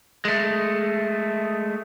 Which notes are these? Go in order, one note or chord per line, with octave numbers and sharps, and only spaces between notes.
G#3 A3